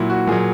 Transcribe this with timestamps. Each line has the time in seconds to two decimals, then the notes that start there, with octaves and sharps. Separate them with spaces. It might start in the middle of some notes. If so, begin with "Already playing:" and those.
Already playing: A#2 F#3 E4
0.10 F#4
0.27 A#2 F#3 G#4